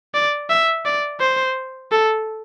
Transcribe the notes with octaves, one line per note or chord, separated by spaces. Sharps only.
D5
E5
D5
C5
A4